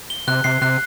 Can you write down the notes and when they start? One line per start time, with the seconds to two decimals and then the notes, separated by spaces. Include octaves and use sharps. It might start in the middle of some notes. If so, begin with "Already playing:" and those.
0.10 G7
0.28 C3 F#6
0.44 C3 C7
0.62 C3 F#6